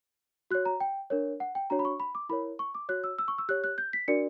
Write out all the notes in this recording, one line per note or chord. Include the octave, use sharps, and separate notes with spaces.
F#4 C#5 F#6
A#5
G5
D4 A#4 C#5
F#5
G5
D4 F#4 C#5 A#5
B5
C#6
B5
D6
E4 A#4 C#5 B5
C#6
D6
F#4 C#5 F#6
E6
E6
C#6
E6
G4 C#5 F#6
F#6
G6
B6
D4 F#4 A#4 D5 C#7